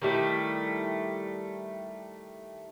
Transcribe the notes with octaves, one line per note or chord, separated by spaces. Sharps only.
D#3 G3 A3 E4